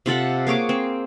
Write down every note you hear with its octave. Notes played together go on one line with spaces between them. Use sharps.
C3 F4 A4 F#5
A#3 G#4 C#5 D6
C4